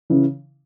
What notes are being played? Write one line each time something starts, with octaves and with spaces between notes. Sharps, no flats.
C#3 E3